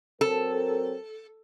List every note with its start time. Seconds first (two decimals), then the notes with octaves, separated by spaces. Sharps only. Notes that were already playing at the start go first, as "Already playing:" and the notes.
0.21 F#3 C4 A4 A#4